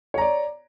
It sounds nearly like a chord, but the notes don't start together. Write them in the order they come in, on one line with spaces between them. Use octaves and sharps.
C#5 A#5 D5